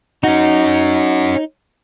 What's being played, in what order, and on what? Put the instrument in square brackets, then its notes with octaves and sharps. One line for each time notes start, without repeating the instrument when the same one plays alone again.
[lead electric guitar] C#4 F#4 [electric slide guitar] D#4